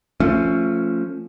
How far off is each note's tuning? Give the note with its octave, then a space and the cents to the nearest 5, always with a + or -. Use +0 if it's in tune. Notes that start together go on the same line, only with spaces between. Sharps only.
F3 +0 A3 +25 C#4 +0